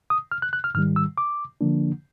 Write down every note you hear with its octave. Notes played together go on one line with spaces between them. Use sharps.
D#6
F6
F#6
F#6
F6
G#2 D#3 G3 F6
E6
D6
D3 F3 A#3 D4